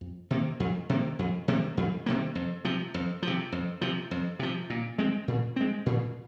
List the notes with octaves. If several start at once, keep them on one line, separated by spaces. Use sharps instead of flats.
F2
C3 D#3 A#3
F2
C3 D#3 A#3
F2
C3 D#3 A#3
F2
C3 D#3 A#3
F2
C3 F3
F2
F3
C3
F2
C3 F3
F2
C3 F3
A#2
G#3 C4
A#2
G#3 C4
A#2